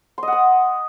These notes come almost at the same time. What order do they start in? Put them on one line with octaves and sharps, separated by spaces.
C6 D#5 F#5 D#6